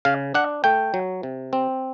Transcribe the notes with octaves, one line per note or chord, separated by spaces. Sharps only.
C#3 F5
D4 F#5
A3 G5
F#3
C3
C4